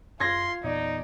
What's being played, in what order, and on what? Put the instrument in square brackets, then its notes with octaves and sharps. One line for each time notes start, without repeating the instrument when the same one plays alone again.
[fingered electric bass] F#2 [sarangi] F4 [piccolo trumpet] C6 [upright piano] G#6 A#6
[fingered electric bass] E2 A#2 B3 [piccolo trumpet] D#4 [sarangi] D5